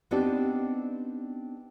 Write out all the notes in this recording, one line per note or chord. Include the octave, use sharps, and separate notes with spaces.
B3 C4 D4 D#4 G4 D5